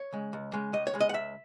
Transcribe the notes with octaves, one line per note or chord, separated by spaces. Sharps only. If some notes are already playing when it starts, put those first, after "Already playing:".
Already playing: C#5
C#3 G#3
C#2
C#3 G#3
C#2 D#5
C#5
C#3 G#3
D#5
F#5
C#2 E5